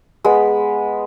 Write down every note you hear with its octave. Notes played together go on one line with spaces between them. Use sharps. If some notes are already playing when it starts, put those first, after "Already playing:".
G#3 B3 B5